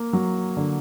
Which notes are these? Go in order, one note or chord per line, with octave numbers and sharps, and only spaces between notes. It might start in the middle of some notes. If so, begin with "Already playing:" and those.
Already playing: A#3
F#3
D3